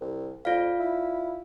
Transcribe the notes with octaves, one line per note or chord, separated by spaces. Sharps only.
C2
F2 F4 D5 F5
E4